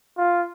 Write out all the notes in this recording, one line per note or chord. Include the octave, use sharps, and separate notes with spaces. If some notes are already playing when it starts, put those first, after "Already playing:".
F4